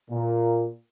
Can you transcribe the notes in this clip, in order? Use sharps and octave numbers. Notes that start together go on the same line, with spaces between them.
A#2